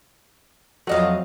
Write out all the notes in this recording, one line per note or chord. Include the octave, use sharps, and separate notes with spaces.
F2 F#3 A3 D#5 F5